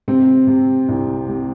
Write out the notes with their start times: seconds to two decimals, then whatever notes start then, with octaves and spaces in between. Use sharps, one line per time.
0.08 C3 C4
0.47 C3
0.89 C2
1.28 C3